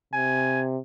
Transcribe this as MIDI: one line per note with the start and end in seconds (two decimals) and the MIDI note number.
0.13 0.78 48
0.13 0.62 80